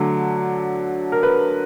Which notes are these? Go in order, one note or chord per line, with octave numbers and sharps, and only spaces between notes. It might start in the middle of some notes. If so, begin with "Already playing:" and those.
Already playing: D3 F#3 A3
A#4
B4